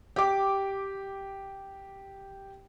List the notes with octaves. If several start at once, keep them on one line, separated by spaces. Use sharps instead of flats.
G4 D6